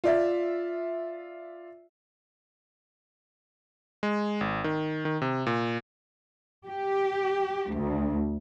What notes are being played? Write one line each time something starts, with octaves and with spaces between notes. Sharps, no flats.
F4 D5 E5
G#3
G#1
D#3
D#3
C3
A#2
G4
D2